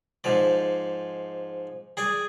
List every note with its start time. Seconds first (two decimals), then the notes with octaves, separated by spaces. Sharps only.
0.24 G#2 F3 D5
1.97 G#4 D5 G#5